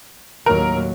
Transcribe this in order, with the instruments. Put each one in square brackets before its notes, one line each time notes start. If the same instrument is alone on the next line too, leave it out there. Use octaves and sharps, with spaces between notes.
[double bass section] D#2 A2 F#3 [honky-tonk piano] A#4